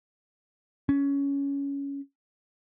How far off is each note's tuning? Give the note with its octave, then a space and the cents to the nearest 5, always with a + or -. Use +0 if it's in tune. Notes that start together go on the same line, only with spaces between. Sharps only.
C#4 +15